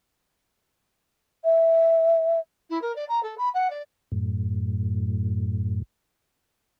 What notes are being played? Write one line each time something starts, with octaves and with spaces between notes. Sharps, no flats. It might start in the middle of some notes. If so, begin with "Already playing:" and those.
E5
E4
A#4
D5
A#5
A4
B5
F#5
D5
F#2 A2